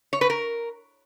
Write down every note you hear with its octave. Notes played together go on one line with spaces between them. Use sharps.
C#5
B4
A#4